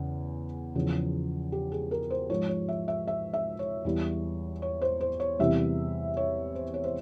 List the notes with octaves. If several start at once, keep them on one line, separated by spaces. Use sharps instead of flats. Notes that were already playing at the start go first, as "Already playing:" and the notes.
Already playing: E2 C#3
E2 C#3 F3
G4
G#4
A#4
C5
G#2 F3 C#5
C#5
E5
E5
E5
E5
C#5
E2 E3 G3
C#5
C5
C5
C#5
E2 C3 E3 G3 E5
C#5
C5
C#5
C5